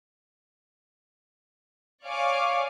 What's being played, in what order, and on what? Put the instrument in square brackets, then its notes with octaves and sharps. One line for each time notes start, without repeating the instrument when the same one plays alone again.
[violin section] C#5 D5 F5 G#5 C#6 D6